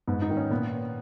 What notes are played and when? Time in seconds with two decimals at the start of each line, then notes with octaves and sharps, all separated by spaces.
0.07 G#2 B3
0.22 D#4
0.30 D#3
0.37 C#4
0.50 A#2 B3